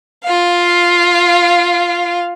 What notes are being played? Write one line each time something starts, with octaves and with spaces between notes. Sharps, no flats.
F4 F5